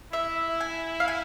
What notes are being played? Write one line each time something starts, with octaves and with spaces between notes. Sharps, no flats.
E4 E5
G#5
F5
G#5